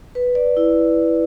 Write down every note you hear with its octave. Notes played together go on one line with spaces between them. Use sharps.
B4
D5
E4